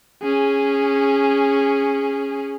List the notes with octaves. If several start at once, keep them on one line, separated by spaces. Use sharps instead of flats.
C#4 G#4